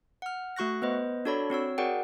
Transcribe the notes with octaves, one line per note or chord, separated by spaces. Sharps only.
F#5 F6
A3 F#4 C#6 F#6 A#6
B3 B4 C5 D#5
D4 F#4 A4 C#5 D5 B5
C4 F#4 C#5 E6
F#4 G#4 A#4 D5 F#5 G5